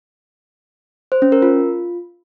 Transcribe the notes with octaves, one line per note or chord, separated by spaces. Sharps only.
C5
C#4
A#4
F4